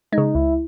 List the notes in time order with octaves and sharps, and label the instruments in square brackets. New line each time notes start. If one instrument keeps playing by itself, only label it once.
[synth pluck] G#3 [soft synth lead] D#4
[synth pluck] C#3
[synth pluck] C#2 [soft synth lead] E4